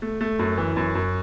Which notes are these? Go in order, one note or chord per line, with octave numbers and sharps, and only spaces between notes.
A3
A3
F#2
E3
F#2
F#2